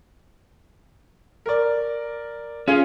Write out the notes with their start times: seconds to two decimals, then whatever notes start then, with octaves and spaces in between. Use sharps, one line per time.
1.46 A#4 D5
2.68 C#4 F4 G#4